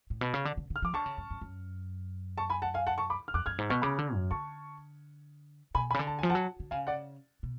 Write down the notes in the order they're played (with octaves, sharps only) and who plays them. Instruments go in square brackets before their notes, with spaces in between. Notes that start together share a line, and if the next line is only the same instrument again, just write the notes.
[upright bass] A2
B2
C#3
D3
D3
D3
[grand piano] F6
[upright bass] F3 [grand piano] D6
[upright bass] D3 [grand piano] A5 C#6
[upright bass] C#3
F#2
F#2
F#2
[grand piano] A5 C#6
G#5 B5
F#5 A5
F5 G#5
F#5 A5
A5 C#6
B5 D6
F6
[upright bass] F2 [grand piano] D6 F#6
[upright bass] F#2 [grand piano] F6 G#6
[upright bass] G#2
[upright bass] B2 [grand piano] C#6 F6
[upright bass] C#3 [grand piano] B5 D6
[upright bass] D3
F#2
[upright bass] D3 [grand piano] A5 C#6
[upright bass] B2 [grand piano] G#5 B5
[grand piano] G#5 B5
[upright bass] C#3
D3
[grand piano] A5
[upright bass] F3 [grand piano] G#5
[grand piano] F#5 A5
[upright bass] F#3
D3
[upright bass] C#3 [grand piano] F5 G#5
[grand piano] D5 F#5
[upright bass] B2